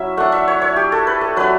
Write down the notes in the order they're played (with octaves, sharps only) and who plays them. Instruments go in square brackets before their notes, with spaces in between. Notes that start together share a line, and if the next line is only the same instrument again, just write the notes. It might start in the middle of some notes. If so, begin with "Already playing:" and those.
Already playing: [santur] F#3 C#4 E4 E5
A3 D4 F#5
E5
C#5
C#5
G4
A4
B4
A4
F#3 A3 D4 B4